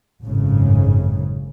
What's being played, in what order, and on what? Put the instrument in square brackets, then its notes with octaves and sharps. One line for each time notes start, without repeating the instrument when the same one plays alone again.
[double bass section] G#1 F#2 A2 C#3